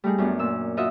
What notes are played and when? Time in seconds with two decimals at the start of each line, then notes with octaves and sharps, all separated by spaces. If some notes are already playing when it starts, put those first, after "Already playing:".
0.04 G3 A3 D#4 G#4
0.18 F#2 A3 B3 D4
0.39 A#2 E6
0.77 D#4 F4 F#4 D#5 E5